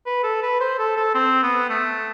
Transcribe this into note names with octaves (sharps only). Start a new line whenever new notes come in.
B4
A4
B4
C5
A4
A4
C4
B3
A3